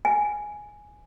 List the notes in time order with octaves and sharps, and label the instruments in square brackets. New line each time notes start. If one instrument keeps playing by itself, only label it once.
[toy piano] G#5